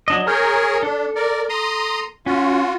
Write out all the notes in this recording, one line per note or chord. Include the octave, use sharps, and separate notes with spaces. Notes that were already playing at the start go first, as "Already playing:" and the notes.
F#3 D4 D#5
G#4 A#4 C#5 A#5 F6 G6
D4 A4
A#4 D5
A#5 C6 D#6
C#4 F4 F#4